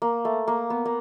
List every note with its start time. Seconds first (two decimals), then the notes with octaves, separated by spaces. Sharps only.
0.02 A#3
0.25 A3
0.48 A#3
0.70 B3
0.85 A#3